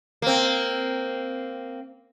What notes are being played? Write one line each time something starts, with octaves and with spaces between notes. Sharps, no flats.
A#3 C4